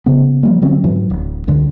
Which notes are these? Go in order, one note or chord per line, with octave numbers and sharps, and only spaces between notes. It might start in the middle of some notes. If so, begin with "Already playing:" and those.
C#3 B3
F3 G3 A#3
D3 F#3 C4 C#4
G#2 E3 F#3
D1
C#2 G2 D3